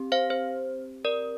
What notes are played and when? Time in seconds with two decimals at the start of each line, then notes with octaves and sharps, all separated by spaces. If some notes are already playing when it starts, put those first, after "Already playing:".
Already playing: C4 G4
0.12 C5 F5
0.30 C5
1.05 A#4 D5